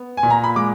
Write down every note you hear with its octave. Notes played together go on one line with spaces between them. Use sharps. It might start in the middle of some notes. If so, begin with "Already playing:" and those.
Already playing: B3
G#5
A#2
A#5
B5
G#3 D6